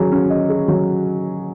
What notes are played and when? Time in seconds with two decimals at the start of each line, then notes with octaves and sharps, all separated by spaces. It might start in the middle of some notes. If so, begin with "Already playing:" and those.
Already playing: F#3 C#4 G#4
0.12 C#4
0.30 D#5
0.49 G#4
0.68 F#3